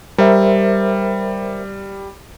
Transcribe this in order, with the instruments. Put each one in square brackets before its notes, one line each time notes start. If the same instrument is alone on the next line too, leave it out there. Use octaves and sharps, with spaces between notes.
[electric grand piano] G3 [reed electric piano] A#4 C5 E5